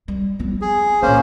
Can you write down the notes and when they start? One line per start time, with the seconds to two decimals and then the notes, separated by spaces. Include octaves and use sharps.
0.08 G3
0.39 F3 B3
0.61 G#4
1.02 A#2 D3 A#3 C#4 C5